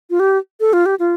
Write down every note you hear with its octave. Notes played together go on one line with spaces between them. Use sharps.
F4
G4
A4
F4
G4
F4